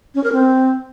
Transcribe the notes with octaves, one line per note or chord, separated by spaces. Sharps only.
C#4
A#4
C4